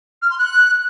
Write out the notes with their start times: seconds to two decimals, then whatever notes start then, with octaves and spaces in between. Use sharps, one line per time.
0.22 F6
0.30 C6
0.38 F#6